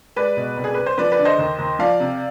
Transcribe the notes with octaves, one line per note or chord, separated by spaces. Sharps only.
G#3 B4 D5
B2
C2
G#4
C2 B4
C5
F3 B4 D5
B4 D5
D3
C5 D#5
D#2
D#2
F3 D5 F5
C3